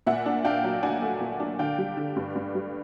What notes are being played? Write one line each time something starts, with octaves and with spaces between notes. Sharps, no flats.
A#2 E5 F#5
D4
D4 F5 G5
F#3
D4 F#5 G#5
A3
A#2
D4
D3 F5 G5
G3
D3
G2
G2
G3